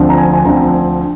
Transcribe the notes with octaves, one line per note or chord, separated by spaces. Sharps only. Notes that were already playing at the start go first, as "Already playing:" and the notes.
Already playing: D2 D3 F3 C4
A#5
G#5
G#5
D2 D3 F3 C4 A#5